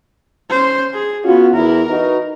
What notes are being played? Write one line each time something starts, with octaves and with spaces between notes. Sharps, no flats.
C#4 C5
G#4
B3 C#4 F4 F#4
E2 E4 A#4
D#4 F#4 B4